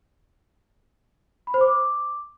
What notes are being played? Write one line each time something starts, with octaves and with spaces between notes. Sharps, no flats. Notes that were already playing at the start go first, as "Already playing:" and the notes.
B5
C5
D6